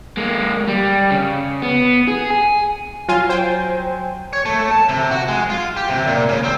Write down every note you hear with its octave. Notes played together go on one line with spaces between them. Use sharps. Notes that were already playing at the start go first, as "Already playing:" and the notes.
G#3 A#3
G3
C#3
B3
G#4
G#5
F#3 F4 G#5 D#7
C5 G5
C#5
A3
A5
C3
F#4
G#3
F4
G4
C3
A#2
C#3
C4